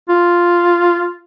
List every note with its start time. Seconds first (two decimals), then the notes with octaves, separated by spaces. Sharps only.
0.09 F4